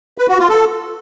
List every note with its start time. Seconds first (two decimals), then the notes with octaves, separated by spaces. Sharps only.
0.18 B4
0.29 F#4
0.39 F4
0.49 A4